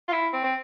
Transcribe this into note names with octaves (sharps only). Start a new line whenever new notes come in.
F4
E4
C4
C4